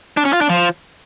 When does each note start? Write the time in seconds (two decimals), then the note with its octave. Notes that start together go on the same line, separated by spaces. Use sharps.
0.17 D4
0.25 C#4
0.33 F4
0.41 D4
0.49 F3